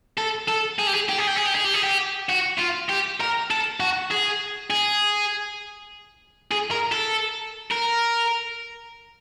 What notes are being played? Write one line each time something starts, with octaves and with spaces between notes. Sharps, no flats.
A4
A4
G#4
G4
G#4
G4
G#4
G4
G#4
G4
G#4
G4
G#4
G4
F#4
F4
G4
A#4
A4
F#4
G#4
G#4
G#4
A#4
A4
A#4